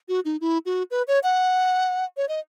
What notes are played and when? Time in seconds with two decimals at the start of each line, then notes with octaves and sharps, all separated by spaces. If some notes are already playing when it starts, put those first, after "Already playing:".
0.08 F#4
0.25 D#4
0.41 E4
0.66 F#4
0.91 B4
1.08 C#5
1.23 F#5
2.17 C#5
2.29 D#5